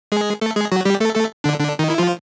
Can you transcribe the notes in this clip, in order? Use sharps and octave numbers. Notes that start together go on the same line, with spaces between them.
G#3 G#4
A3 A4
G#3 G#4
F#3 F#4
G3 G4
A3 A4
A3 A4
D3 D4
D3 D4
D#3 D#4
E4
F3 F4